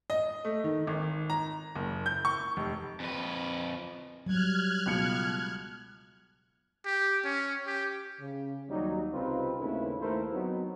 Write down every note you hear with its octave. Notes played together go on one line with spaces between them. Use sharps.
D#5
A3
D#3
G#1
A#5
F#1
G6
C#6
F1
F2 B4
F#3 G3 F6 F#6 G#6
C#2 B2 C#7
G4
C#4
G4
C#3
D#2 F#3 G3 D#4
C2 C#3 C4 D#4 F4 B4
G#1 D#2 C#3 A3 E4 B4
D#2 A3 E4 A#4 C5
F#3 B3 C4 D#4